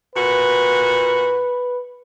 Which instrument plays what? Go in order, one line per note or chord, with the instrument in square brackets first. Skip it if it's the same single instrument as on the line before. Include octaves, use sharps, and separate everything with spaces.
[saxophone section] A#2 F#4 [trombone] B4